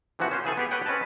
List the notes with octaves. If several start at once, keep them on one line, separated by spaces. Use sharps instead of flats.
C3 E3 F3 B3 F#4
C#4 C5
C#3 E3 G#4 A4
B3 G4 G#4
G4 A4 B4 C#5 F#5 G5
C4 C#4 B4 D#5 A5